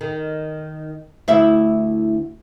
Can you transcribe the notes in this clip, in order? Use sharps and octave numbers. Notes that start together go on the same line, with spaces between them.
D#3
D2 E4 E5